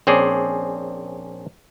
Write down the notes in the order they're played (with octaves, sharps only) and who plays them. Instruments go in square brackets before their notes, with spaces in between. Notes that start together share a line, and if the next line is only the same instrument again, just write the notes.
[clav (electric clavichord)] A#1 C4 C#4 G#4 D5